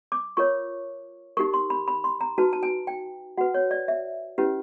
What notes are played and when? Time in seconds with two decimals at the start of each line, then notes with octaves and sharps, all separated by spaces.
0.12 D6
0.37 F4 A#4 C#5 C#6
1.37 D#4 G4 A#4 C#6
1.54 C6
1.70 B5
1.88 B5
2.04 C6
2.21 A#5
2.38 D#4 F#4 B4 A5
2.53 A5
2.63 G#5
2.87 G5
3.38 F#4 B4 F#5
3.54 C#5
3.71 D5
3.88 E5
4.38 C#4 E4 G4 B4